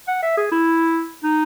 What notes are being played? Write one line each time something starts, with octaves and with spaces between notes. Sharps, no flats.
F#5
E5
G#4
E4
D#4